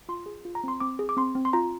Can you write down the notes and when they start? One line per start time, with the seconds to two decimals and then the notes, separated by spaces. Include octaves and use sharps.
0.09 F4 C6
0.26 G#4
0.45 F4
0.55 A#5
0.64 C4 C6
0.80 C4 D6
0.99 G#4
1.09 D6
1.17 C4 C6
1.35 C4
1.45 C6
1.53 F4 A#5